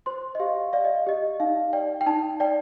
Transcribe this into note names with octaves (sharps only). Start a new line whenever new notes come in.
C5 C6
D#5
G4 F5
D5 F5
D#5
G4 D#5
D#4 F5
D5 G5
G5
D#4 A5
D5 G5